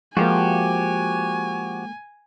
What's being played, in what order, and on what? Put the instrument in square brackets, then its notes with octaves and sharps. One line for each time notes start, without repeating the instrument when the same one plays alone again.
[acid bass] F3 [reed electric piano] G#3 A#3 [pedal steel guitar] F#4 G4 [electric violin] G#5